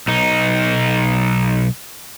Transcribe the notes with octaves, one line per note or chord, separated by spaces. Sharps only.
B1 D#4